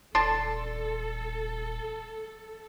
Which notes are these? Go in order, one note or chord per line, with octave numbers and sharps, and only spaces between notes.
D#1 D4 A4 A5 C6